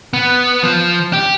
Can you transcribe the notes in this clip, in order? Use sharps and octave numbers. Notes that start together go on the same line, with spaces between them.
B3
F3
G4